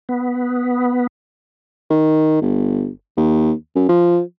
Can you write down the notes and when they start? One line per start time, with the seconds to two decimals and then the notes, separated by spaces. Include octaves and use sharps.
0.09 B3
1.90 D#3
2.41 G1
3.17 D#2
3.75 F#2
3.89 F3